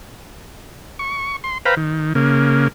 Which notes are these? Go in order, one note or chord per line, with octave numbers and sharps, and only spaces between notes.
C#6
C6
B4 C5 F5 G5 A#5 B5
D#3
C#3 A#3